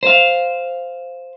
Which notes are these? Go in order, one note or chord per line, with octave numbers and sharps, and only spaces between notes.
C5 F5